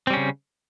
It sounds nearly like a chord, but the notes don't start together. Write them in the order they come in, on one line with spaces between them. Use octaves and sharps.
C4 G3 C#4 C#3